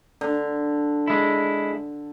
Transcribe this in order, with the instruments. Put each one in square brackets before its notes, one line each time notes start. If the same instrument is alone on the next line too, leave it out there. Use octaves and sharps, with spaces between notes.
[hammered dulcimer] D3
[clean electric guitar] G#3 E4